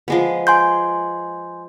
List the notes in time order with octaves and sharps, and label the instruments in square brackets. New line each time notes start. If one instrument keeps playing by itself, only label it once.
[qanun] F3 G#3 B3
[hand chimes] G#5 C6 G6